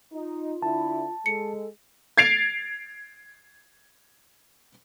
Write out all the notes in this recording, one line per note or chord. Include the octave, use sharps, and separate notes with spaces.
D#4 F4
D3 E4 A5
G#3 A4 C#7
G#6 A6 C7 D7 F7